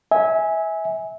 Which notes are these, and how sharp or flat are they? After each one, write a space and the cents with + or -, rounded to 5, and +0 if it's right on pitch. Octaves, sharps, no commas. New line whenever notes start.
E5 -25 G#5 +0